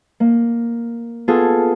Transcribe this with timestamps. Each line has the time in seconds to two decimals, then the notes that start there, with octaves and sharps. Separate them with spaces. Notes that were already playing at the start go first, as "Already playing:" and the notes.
0.20 A#3
1.28 B3 F4 G#4 A4